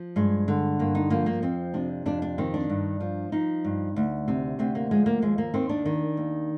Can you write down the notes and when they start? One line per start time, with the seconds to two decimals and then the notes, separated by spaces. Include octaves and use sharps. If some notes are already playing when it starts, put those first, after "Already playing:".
Already playing: F3
0.16 G2 G#3
0.48 D3
0.79 G2 A#3
0.95 D#4
1.10 F3 A#3
1.26 A#3
1.42 F2 C4
1.74 C3 D4
2.06 F2 D4
2.22 D4
2.38 D#3 C4
2.54 D4
2.69 G2
3.01 F3
3.32 F3 D#4
3.65 G2
3.96 D2
4.28 C3
4.59 D2 C4
4.75 A#3
4.91 F3 G#3
5.06 A#3
5.22 D#2 G#3
5.38 A#3
5.54 D#3 C4
5.69 D4
5.86 D#3
6.17 D#2